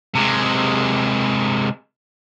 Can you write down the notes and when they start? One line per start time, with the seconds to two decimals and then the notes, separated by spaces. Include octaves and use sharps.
0.15 C3 G#3